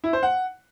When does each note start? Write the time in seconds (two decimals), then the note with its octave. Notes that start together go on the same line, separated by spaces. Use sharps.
0.04 E4
0.13 C5
0.23 F#5